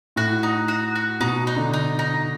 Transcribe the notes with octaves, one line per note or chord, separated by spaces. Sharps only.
A2 F#4
D#4
F#4
F#4
B2 D#4
D#4
D3
D#4
D#4